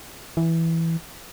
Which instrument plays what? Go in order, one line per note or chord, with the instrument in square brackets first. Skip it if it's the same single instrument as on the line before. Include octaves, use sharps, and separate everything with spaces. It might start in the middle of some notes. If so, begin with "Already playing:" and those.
[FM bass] E3